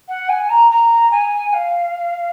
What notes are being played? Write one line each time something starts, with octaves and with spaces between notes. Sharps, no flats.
F#5
G#5
A#5
A#5
G#5
F5